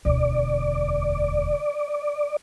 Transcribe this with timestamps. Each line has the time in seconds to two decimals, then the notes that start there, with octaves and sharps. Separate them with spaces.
0.05 E1 D2 D5